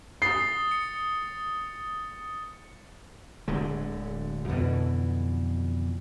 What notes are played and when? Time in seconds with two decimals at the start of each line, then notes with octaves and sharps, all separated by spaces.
0.22 D#6 A6 C7 G7
0.71 C#7
3.48 D1 D3 G#3
4.48 F2 B2 D3 E3